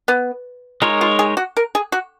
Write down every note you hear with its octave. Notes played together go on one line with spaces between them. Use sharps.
B3
G#3 D#4 F4 A#4 C#5
F4
G#4
F#4
A#4
G#4
F#4